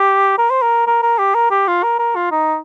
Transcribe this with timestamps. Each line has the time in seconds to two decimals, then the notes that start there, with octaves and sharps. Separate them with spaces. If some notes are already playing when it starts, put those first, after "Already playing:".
Already playing: G4
0.38 A#4
0.51 C5
0.62 A#4
0.87 A#4
1.03 A#4
1.19 G4
1.35 A#4
1.51 G4
1.68 F4
1.83 A#4
1.99 A#4
2.16 F4
2.32 D#4